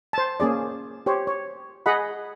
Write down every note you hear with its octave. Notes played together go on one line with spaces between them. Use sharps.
C5 A5
A#3 C#4 G#4 D5
G4 C5 C#5
C#5
G#4 D#5 F#5 B5